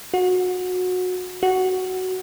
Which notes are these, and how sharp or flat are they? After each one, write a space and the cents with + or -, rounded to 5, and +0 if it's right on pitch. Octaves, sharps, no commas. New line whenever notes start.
F#4 -20
F#4 +10